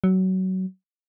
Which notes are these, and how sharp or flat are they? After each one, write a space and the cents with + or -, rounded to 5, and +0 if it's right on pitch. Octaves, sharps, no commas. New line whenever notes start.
F#3 +20